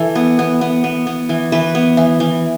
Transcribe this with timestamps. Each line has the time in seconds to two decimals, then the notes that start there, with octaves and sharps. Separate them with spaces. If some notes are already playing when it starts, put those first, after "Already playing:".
Already playing: E3 A4
0.15 B3
0.39 B3
0.61 B3
0.84 B3
1.07 B3
1.29 E3
1.52 E3 B4
1.75 B3
1.97 E3
2.20 E3